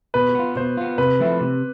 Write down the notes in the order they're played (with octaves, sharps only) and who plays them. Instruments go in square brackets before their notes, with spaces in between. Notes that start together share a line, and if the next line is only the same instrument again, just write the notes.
[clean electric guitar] B2 [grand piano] B4
[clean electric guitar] B3 F4
[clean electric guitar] B2 [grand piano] C5
[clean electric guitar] B3 F4
[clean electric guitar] C3 [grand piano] B4
[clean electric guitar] F3 A3 C4 E4
C3